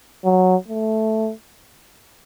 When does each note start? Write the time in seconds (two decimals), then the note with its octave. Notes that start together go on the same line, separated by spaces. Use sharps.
0.25 F#3
0.69 A3